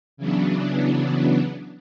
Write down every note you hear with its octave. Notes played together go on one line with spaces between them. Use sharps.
C#3 E3 F#3 B3 D4